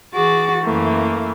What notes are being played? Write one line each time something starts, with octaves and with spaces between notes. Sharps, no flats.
E3 F#4 G#4 D6 A6
F#2 E3 A3 A#3